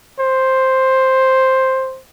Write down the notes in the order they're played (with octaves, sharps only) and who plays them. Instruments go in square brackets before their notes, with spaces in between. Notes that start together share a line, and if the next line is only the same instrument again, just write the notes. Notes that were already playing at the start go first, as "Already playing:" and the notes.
[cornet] C5